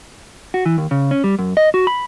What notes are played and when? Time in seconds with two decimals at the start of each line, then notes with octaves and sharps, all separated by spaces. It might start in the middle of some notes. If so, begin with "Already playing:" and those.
0.54 F#4
0.66 E3
0.78 D#2
0.91 C#3
1.11 C#4
1.24 G3
1.39 F#2
1.57 D#5
1.74 F#4
1.87 B5